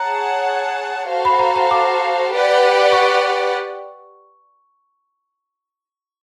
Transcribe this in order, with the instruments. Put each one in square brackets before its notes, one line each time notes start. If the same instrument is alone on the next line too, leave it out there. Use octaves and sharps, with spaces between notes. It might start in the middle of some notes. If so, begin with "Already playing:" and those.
Already playing: [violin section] G#4 C#5 F#5 A5 [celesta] A#5
[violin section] F#4 A4 C5 F5
[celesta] B5
A#5
A#5
D6
[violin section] G4 B4 D5 F#5
[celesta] C#6